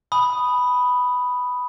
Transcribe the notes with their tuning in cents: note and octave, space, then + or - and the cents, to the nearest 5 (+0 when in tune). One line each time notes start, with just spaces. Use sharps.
G#5 +25 B5 +0 D#6 -5